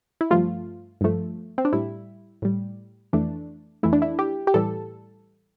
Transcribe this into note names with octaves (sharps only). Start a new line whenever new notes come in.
E4
G2 F3 A3 F4
G2 F3 A3
C4
D4
A2 G3 E4
A2 G3
F2 E3 A3 D4
F2 E3 A3 E4
D4
E4
G4
G4
A2 E3 G3 A4